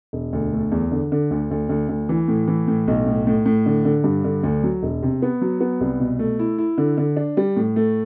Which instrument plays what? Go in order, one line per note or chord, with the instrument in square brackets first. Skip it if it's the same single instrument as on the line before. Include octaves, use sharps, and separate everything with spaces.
[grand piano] E1
D2
A3
E2
D3
D3
D2
D2
D2
D2
E3
A2
E3
A2
B1
A2
A2
A2
D3
D3
G2
D3
D2
F#3
E1
C3
B3
F#3
B3
C2
B2
A3
E4
E4
D3
D3
D4
G3
A2
A3